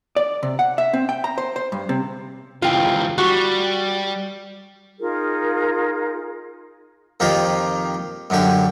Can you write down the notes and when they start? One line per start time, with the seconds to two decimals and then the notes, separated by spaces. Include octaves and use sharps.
0.16 D5
0.43 C3
0.59 F#5
0.78 E5
0.93 C4
1.09 G5
1.24 A#5
1.38 C5
1.56 C5
1.72 G2
1.89 C3
2.62 C#2 E3 F4 G5
3.18 G3 F#4
4.99 D#4 F4 G#4 A#4
7.20 F2 D#3 A#3 F4 G4
8.30 F#2 D3 G4